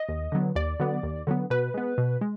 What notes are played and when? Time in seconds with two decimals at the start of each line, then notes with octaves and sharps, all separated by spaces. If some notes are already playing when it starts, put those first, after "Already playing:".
Already playing: D#5
0.09 D#2
0.32 D3 F#3 B3
0.56 D#2 D5
0.80 D3 F#3 B3
1.03 D#2
1.27 D3 F#3 B3
1.50 B2 B4
1.74 G#3 B3
1.98 B2
2.21 G#3